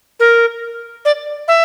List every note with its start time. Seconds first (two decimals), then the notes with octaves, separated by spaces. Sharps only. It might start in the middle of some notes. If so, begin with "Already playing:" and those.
0.20 A#4
1.05 D5
1.48 E5